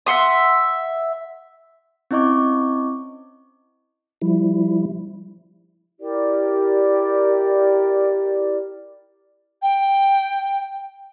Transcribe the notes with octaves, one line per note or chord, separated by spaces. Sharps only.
E5 F#5 C6 D#6
C4 C#4 E4 D#5 C#6 D6
F3 G3 E4
E4 G4 A#4 D5
G5